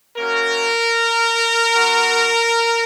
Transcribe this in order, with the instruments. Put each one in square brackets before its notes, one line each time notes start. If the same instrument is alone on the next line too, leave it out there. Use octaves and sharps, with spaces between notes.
[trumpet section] A#3 C#4 F#4 A#4
B3 F#4